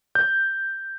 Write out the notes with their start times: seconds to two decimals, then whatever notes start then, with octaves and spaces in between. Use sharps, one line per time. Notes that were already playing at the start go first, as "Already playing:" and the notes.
0.15 G6